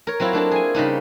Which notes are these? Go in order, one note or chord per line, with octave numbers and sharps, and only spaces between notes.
A#4 C#5
F#3 C4 E4 F4
A#3 D4 A4 A5
G#4 G#5
C#3 G3 D4 D#4